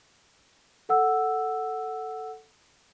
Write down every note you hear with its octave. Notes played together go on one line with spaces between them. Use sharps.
A4 F#5 E6